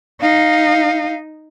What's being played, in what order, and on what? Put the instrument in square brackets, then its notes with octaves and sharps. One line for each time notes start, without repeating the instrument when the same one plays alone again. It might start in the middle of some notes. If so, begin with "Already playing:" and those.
[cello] D#4 [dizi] F5